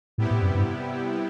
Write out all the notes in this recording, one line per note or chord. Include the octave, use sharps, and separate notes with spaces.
A2 C3 G3 B3 E4 G4
A2
F#2
G2